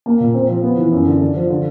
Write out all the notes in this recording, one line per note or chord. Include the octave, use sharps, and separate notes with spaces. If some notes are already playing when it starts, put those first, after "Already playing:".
A#3
A#2
C4
F3
B3
E3
F#2
D3
D4
F3
D3